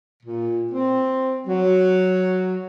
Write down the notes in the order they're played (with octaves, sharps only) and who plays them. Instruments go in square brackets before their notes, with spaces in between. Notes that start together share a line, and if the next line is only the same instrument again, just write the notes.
[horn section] A#2
C4
F#3